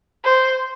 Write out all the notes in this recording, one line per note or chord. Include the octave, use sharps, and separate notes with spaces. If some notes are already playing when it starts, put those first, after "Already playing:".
C5